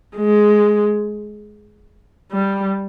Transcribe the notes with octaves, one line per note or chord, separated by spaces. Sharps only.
G#3
G3